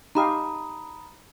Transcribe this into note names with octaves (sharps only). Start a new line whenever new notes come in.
D#4 G4 F5 A#5 B5 D#6